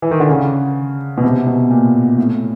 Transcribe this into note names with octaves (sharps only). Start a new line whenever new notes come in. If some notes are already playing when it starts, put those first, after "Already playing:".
E3
D#3
D3
C#3
B2
C3
B2
A#2
A2